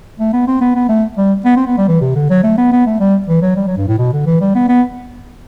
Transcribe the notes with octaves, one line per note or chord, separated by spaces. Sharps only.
A3
B3
C4
B3
B3
A3
G3
B3
C4
B3
G3
E3
C3
D3
F#3
A3
B3
B3
A3
G3
E3
F#3
G3
F#3
G2
A2
B2
D3
E3
G3
B3
B3